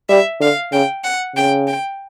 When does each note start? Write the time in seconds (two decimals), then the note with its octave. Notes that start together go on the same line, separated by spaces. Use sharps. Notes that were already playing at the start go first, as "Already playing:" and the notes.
0.09 G3 E5
0.40 D3 F5
0.72 C#3 G5
1.04 F#5
1.36 C#3 G5
1.67 G5